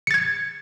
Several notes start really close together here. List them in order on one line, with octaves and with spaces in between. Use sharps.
C#7 A6 G#6